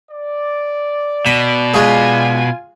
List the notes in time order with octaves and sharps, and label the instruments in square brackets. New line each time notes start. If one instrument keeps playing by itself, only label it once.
[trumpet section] D5
[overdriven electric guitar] B2 [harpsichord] B5
[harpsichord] G#3 F#4 G#4 [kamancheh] F4 G#5